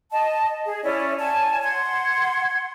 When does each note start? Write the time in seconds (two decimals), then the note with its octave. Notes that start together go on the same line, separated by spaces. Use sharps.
0.12 D#5 A5
0.65 G#4
0.84 C#4 E4 D5
1.19 C#5 G#5 A5
1.63 F#5 C6 G#6